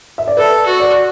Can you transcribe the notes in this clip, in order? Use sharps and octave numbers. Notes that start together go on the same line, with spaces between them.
E5
D5
A4 B4
F#4
D5